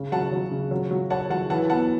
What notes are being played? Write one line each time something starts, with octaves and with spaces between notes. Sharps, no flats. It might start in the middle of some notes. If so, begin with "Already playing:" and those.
Already playing: C#3
F#3 F#5 A5
F#3
C#3
F#3
F#3
C#5 F#5 A5
F#3 F#5 A5
E3 F#5 A5
B3 F#5 A5